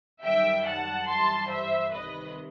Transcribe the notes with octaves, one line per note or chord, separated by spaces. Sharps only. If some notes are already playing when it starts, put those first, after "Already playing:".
F#2 D#3 G3 E5 G5
F#5 A5
G2 E3 G3 A5 C6
C5 E5
C2 C3 D#3 B4 D#5